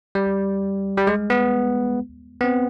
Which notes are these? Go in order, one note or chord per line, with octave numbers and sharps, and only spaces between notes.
G3
G3
G#3
B3
B3
C4